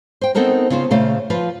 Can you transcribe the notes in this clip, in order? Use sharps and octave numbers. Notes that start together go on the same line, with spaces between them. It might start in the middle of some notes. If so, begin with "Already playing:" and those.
C5 G5
B3 C4 D#4 A4 A#4 C5
C#3 F4 C5
A#2 C#3 A3 C5 F5
F3 F4 B4